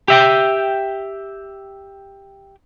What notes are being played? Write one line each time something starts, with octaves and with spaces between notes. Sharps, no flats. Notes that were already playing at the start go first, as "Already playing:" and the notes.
G4 E5 G5